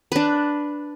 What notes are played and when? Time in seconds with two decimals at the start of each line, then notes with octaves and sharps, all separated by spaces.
0.12 D4 B4